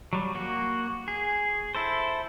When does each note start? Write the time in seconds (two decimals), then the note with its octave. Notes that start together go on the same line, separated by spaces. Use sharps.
0.13 F#3 G3
0.35 A#3 F#4
1.08 G#4
1.75 E4 A4 C5